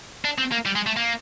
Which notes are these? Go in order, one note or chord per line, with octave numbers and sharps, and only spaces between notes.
D4
C4
A#3
G3
G#3
A3
A#3